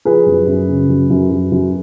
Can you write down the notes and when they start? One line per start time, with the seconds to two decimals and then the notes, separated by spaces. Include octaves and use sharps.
0.05 F3 G#4 B4
0.26 F#2
0.47 F#2
0.68 C#3
0.89 F#2
1.10 F#2
1.31 F#2
1.52 F#2